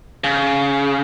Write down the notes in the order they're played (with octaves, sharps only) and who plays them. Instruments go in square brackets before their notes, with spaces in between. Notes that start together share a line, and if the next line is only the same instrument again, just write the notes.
[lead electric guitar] C#3